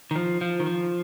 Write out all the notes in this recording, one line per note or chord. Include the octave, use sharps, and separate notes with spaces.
D#3
F3
F3
D#3
F3